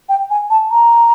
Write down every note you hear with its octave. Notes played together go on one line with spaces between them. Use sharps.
G5
G#5
A5
A#5